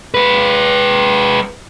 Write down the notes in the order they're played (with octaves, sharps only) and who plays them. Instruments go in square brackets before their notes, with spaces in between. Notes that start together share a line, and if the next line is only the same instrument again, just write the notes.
[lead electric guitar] G#3 B4